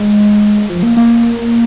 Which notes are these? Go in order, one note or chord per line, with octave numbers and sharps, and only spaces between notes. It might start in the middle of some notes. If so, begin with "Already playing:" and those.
Already playing: G#3
F3
A#3
A#3